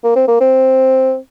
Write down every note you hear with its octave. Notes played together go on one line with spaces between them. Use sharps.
A#3
C4
A#3
C4